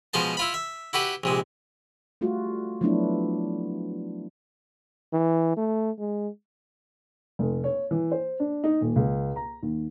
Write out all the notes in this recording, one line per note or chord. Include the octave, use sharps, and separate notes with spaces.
B2 F3 G#3 C5 A5
E4 F4 B5
E5
E4 F#4 G4 B4
A#1 C3 G#3
G3 A3 F4 F#4
F3 F#3 A3 B3 D4 E4
E3
A3
G#3
F1
C#5
E3
C5
D4
D#4
D#1
C#2
A#5
D#2